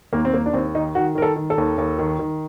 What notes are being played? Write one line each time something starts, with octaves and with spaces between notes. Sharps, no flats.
D#2 A#3
C4
D#2 A#3
D4
D#2 C4
D#3 D#4
D#3 F#4
D#3 A#4
A4
D#3
A4
D#2
D#2
D#3
D#3